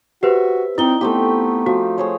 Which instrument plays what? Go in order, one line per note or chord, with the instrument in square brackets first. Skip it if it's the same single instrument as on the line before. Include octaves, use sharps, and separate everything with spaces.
[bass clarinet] F#4 [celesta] G4 B4 C5 [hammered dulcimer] E5
[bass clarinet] C4 [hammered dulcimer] D#4 D6 [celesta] E4 G7
[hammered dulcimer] A3 C4 G4 [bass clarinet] B3
[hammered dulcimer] F3 [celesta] F#4
[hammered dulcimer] G#4 C5 C#5